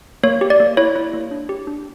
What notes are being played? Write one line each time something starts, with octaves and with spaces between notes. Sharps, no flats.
A#3 C#5
G4
D5
A#3
E4 C#5
E4
A#3
D4
G4
D4